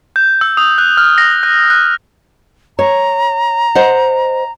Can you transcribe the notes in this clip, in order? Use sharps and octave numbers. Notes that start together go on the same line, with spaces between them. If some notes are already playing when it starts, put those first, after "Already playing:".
G6
E6
D#6
F#6
F6
A#6
F#6
F#6
C#5 A#5
C5 D#5 F#5